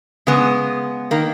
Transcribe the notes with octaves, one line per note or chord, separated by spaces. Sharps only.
C#3 G#3 B3
D#3 A#3